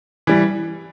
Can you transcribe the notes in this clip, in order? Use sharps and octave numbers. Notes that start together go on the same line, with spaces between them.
E3 G3